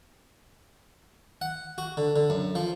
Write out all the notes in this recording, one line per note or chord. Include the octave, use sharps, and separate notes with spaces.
F#5
F#4
D3
D3
F#2
F3